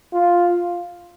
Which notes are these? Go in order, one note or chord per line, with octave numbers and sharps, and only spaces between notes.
F4